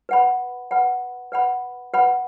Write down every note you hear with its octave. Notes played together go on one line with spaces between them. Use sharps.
B4 F#5 B5
B4 F#5 B5
B4 F#5 B5
B4 F#5 B5